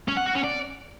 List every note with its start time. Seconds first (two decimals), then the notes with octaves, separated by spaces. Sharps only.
0.08 C#4
0.17 F#5
0.26 F#4
0.35 C#4
0.44 D5